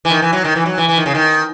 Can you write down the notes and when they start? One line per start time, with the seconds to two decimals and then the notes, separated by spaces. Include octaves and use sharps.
0.05 E3
0.10 D#3
0.22 E3
0.33 F#3
0.44 D#3
0.56 E3
0.66 F#3
0.78 E3
0.89 E3
0.97 D#3
1.06 C#3
1.15 D#3